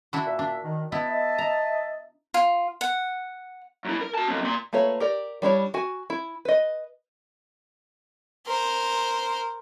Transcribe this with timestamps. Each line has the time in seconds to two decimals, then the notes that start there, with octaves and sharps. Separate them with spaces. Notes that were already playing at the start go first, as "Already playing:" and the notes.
0.13 D4 E4 F#4
0.25 A#2 E5
0.39 D4
0.64 D#3
0.92 B3 E4 D#5 E5 A5
1.38 A#5
2.34 F4
2.81 F#5
3.85 F#2 E4
4.01 A#4
4.15 F#4 A5
4.28 F#3 C4
4.42 A#2 C6
4.73 A3 A#3 F4 B4 C#5
5.00 G4 A#4 D5
5.42 G3 D4 E4 C#5
5.74 F#4 G#5
6.10 E4
6.45 B4 D#5
8.47 A#4 C5